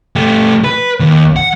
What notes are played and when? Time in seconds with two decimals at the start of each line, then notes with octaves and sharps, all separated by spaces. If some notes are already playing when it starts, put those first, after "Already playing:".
0.16 A3 G4
0.64 B4
1.00 D#2
1.36 F#5